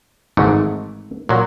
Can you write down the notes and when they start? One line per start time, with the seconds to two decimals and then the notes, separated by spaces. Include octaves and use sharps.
0.37 G#1 G#2 E3 A3
1.29 A#2 F#3